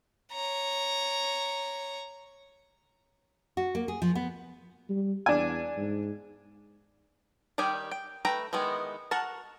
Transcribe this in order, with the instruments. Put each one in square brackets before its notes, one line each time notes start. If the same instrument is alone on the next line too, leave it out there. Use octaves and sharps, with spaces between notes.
[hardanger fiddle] C#5 A#5
[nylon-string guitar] F#4
A#3
G#4
F3
B3
[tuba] G3
[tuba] E2 [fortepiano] D4 G#5
[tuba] G#2
[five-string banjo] D#3 G3 G4 G#5
G5
A3 B4 G5 A#5
D#3 E3 G#3 B3
F#4 A#4 F#5 A5